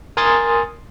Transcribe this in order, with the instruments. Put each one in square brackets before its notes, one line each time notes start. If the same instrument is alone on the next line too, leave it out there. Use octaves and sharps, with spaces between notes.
[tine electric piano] A#4 G#5 C6 D#6 A6